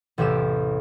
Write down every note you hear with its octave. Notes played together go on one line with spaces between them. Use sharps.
A1 E2 C3 G4 E7